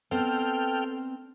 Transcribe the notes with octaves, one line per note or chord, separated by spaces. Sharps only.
B3 C4 A4 D5 G5 F6